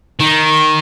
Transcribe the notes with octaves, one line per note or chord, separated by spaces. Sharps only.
D#3